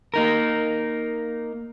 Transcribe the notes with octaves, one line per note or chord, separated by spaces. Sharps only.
A#3 D#4 A#4